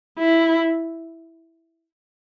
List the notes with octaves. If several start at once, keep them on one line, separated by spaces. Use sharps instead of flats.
E4